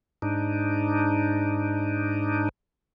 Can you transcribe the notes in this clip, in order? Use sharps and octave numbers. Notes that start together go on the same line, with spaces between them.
G#2 D4 D#4